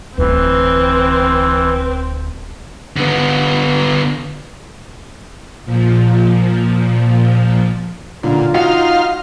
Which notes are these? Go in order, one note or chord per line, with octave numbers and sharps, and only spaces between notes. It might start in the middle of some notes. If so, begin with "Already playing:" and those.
D1 D3 E3 C4 B4
D3 B3
A#2 F3
B1 A#2 D3 F4
D#4 F#4 F5 C6 F6